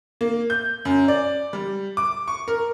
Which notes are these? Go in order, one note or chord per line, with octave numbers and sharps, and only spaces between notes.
A#3
G6
F#2
D5
G3
D6
C#6
A#4